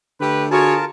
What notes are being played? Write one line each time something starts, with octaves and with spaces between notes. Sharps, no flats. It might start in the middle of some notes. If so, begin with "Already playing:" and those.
D3 A3 G4 B4
F4 F#4 G#4 A#4 C#5 A5